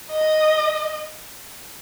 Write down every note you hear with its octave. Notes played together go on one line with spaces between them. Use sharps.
D#5